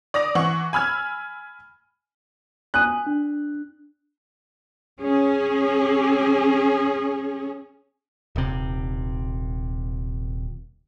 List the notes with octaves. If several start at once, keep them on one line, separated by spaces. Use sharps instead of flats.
D5 D#6 A#6 F7
E3 F#5 C#6 F#7
G#5 B5 E6 F6 G#6
G#5 D#6 F#6 D#7
D4
C#4 G#4
D#1 C3